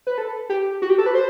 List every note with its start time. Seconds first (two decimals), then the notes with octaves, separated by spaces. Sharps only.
0.07 B4
0.18 A4
0.49 G4
0.82 F#4
0.90 G4
0.98 A4
1.06 B4
1.15 C5